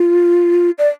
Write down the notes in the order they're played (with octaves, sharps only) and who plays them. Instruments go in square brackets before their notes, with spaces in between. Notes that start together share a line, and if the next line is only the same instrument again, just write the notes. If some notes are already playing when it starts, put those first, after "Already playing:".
Already playing: [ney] F4
D5